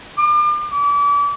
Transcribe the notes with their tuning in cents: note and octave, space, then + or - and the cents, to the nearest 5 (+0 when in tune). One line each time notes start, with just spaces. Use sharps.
D6 +40
D6 -35